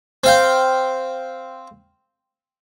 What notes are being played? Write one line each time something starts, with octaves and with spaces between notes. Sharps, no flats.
C4 F5 G5